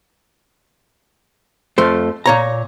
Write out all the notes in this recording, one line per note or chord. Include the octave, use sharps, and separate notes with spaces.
F2 F3 A3 C5
A#2 C#5 A#5